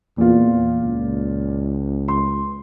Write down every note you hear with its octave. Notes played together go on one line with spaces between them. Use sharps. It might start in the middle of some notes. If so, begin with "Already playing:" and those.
E2 A#2 F4
C#2
C6